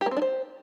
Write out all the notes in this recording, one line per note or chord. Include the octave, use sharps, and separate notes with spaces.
G4
A#3
C4
D4
C5